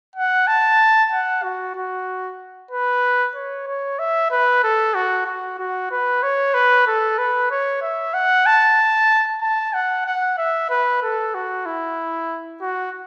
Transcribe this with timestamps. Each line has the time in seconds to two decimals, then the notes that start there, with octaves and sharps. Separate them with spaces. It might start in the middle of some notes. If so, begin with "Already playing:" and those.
0.16 F#5
0.47 A5
1.12 F#5
1.43 F#4
1.75 F#4
2.71 B4
3.35 C#5
3.67 C#5
3.99 E5
4.31 B4
4.63 A4
4.95 F#4
5.26 F#4
5.59 F#4
5.91 B4
6.23 C#5
6.54 B4
6.87 A4
7.18 B4
7.51 C#5
7.82 E5
8.14 F#5
8.46 A5
9.42 A5
9.74 F#5
10.06 F#5
10.38 E5
10.70 B4
11.02 A4
11.34 F#4
11.66 E4
12.61 F#4